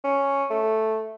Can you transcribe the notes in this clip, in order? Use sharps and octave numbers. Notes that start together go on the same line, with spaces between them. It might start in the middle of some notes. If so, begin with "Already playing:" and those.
C#4
A3